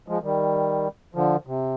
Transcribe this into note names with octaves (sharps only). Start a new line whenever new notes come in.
F3 G#3
D#3 G3
D3 F3
C3